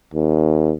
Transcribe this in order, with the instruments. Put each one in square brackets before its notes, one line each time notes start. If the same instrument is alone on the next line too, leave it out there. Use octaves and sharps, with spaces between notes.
[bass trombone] D#2